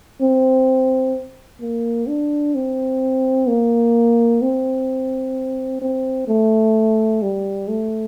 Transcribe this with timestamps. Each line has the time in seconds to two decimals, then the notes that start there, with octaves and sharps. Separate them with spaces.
0.21 C4
1.61 A#3
2.08 D4
2.55 C4
3.48 A#3
4.42 C4
5.81 C4
6.28 A3
7.22 G3
7.68 A3